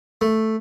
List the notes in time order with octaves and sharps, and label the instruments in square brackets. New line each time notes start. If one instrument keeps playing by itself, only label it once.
[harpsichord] A3